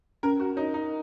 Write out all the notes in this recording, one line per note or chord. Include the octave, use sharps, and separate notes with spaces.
C#4 A#4
F#4
D#4 C#5
D#4